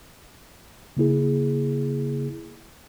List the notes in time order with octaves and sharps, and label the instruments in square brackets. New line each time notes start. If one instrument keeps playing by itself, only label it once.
[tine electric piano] C#3 A#3 E4 G#4